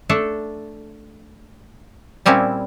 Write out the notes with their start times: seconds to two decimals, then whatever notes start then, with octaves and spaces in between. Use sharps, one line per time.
0.09 A3 D4 A4
2.26 A#2 G3 C4 C#4 E4